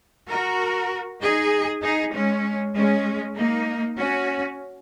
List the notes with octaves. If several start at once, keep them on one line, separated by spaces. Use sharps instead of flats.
F#4 A#4
D#4 G#4
D#4 G#4
G#3 C#4
G#3 C#4
A#3 D#4
C#4 F#4